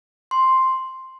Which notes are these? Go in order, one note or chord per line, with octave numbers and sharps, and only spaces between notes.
C6